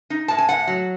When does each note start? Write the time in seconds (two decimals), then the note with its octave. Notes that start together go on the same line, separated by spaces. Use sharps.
0.10 D#4
0.28 A2 A5
0.38 G#5
0.48 A2 F#5
0.67 F#3